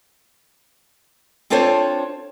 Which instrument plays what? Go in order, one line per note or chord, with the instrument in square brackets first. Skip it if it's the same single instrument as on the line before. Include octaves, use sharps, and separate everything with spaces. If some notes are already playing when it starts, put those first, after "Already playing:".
[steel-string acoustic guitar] C4 D4 F4 A4 C5 C#5